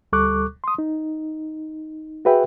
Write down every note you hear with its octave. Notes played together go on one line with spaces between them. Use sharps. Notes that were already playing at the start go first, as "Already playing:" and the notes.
D2 G3 A4 C#6 D6 F#6
C6 D#6
D#4
F#4 G#4 B4 E5 G5